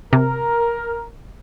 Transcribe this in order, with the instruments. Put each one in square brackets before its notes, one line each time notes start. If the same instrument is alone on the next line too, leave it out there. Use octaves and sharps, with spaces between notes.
[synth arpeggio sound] C3 [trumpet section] A#4